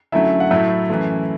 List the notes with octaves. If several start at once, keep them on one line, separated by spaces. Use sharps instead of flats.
F#2 D3 F#3 A3 E4 E5
F#5
A2 F#3 A3 E4 E5
F#2 E3 A3